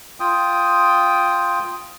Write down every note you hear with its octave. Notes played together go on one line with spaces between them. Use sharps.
F4 G5 D#6